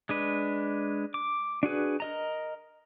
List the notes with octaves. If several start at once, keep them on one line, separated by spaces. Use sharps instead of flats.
G#3 D4 B4
D6
D4 F#4 G#4 B4
A#4 D#5 A#5